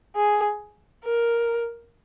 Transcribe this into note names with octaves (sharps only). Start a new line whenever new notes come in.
G#4
A#4